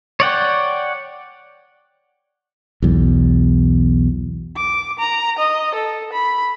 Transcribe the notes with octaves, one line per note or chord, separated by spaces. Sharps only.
C#5 D5 F#5 G5
B1 E2
D6
A#5
D#5
A4
B5